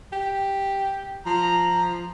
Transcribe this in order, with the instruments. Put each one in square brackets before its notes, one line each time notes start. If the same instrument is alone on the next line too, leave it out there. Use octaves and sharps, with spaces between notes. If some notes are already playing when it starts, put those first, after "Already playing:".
[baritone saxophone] G4
[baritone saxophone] F3 [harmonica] A#5